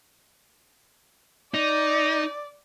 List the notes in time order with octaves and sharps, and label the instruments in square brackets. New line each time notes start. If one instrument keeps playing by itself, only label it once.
[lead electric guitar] D#4 [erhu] D5